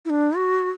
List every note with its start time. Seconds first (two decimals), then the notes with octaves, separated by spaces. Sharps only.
0.05 E4
0.10 D4
0.37 F#4